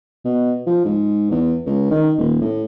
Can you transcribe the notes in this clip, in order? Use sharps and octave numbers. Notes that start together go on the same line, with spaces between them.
B2
F3
G#2
E2
C#2
D#3
D#1
A2